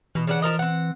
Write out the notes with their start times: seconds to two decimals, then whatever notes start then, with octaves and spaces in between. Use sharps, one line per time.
0.15 B2 E3
0.27 C#3 D4 F#5
0.42 F3 A#4 D#5
0.59 C4 F#5